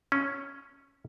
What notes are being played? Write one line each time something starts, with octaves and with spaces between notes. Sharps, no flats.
C#4